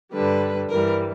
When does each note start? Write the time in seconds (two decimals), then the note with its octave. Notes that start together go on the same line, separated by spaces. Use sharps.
0.12 G2 D3 G3 B4
0.69 G2 E3 G3 A#4